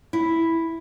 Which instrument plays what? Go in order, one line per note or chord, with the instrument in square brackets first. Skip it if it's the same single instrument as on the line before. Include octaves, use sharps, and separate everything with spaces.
[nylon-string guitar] E4